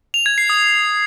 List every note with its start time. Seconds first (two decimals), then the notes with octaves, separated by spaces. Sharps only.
0.14 F7
0.26 G#6
0.38 C7
0.50 D#6